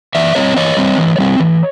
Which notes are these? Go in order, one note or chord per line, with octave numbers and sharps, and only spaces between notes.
E3 D5 E5
G3 C4 C#5 D#5
E3 C#5 D#5
G3 C4
E3
G3 C4
E3